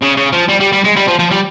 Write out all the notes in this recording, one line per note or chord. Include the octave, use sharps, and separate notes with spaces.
C#3
C#3
F3
G3
G3
G3
G#3
G3
F3
F3
G3